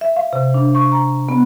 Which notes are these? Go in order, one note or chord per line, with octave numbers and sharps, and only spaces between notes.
E5
F5
C3
D4
C#6
A#5
B3